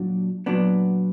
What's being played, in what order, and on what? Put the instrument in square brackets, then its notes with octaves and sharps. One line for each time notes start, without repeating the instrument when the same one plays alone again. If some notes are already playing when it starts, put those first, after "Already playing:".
Already playing: [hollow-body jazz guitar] A#2 F#3 D4
A#2 F#3 B3 D4